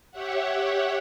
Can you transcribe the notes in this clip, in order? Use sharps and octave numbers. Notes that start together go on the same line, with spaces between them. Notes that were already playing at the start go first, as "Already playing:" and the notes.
G4 C#5 E5 F#5